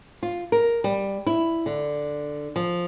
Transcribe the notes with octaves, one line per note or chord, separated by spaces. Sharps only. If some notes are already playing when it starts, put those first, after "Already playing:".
F4
A#4
G3
E4
D3
F3